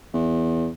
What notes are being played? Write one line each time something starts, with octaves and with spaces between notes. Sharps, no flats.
E2